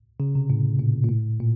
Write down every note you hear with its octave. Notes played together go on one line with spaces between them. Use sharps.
C#3
C3
A2
A#2
A#2
A2
A#2